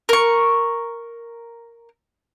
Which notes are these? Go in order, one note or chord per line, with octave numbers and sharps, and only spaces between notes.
A#4 C#6